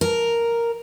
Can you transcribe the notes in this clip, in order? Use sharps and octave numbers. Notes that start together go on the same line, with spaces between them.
A#4